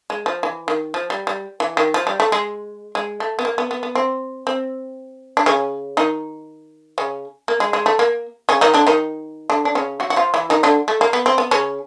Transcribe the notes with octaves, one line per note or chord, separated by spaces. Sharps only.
G#3
F3
E3
D#3
F3
G3
G3
E3
D#3
F3
G3
A3
G#3
G#3
A3
B3
A#3
B3
B3
B3
C4
C4
D4
C#3 C#4
D#3 D#4
C#3 C#4
A#3
G#3
G#3
A3
A#3
C#3 C#4
D#3 D#4
D3 D4
D#3 D#4
D3 D4
D4
C#3 C#4
F#3 F#4
F#4
F3 F4
E3 E4
D#3 D#4
D3 D4
A3
A#3
B3
C4
B3
C#3 C#4